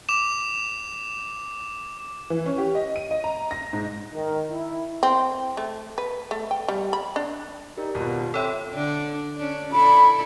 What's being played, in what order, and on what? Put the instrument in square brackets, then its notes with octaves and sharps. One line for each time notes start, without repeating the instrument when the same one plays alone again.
[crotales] D6 E7
[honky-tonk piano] E3
C#4
G4
D#5
D#7
D#5
A#5
A#6
G#2
[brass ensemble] D#3
E4
[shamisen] C4
A3
B4
A3
G5
G3
B5
D4
[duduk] D#4 [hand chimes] G4 A#4 D5
[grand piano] G#1 B2 [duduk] F4
[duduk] C4 [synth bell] A4 C#5 [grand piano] E5 G5 E6 [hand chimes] B5
[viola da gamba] D3 D4
C#4 D4
[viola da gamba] E4 A4 D5 [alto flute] B5